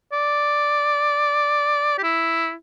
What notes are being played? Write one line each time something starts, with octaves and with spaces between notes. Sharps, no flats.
D5
G4
E4